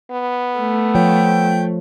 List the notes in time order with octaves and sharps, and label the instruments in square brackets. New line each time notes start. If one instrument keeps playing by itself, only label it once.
[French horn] B3
[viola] A3
[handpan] F3 F4 C#5 [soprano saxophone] G5